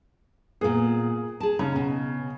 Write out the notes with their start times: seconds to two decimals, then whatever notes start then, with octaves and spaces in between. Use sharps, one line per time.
0.61 A#2 B3 G#4
1.40 G#4 A5
1.59 C#3 C#4 D#4
1.76 B2